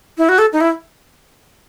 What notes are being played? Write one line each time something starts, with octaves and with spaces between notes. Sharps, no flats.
E4
F#4
A4
D#4
E4